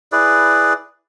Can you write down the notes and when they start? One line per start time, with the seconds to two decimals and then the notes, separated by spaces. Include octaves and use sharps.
0.12 E4 G#4 B4 D5